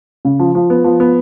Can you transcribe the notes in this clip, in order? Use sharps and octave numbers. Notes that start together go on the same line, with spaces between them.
C#3
F3
F3
B3
F3
B3